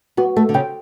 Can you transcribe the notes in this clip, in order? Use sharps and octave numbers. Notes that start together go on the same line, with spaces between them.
B3 F#4
A3 A4
D3
C#3 G5